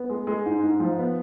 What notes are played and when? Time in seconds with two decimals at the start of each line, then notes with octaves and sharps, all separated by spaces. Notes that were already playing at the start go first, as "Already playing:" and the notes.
Already playing: B3
0.09 G#3
0.27 G#3
0.46 G#2
0.63 G#2
0.80 F3
0.99 B3